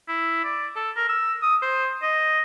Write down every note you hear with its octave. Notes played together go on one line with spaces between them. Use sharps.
E4
D5
A4
A#4
E6
D#6
C5
D#5